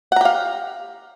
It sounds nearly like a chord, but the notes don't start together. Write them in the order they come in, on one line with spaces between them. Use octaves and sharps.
F#5 A#5 G4 F5